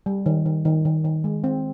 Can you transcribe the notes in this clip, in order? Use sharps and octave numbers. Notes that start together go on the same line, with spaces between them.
G3
D#3
D#3
D#3
D#3
D#3
G#3
C4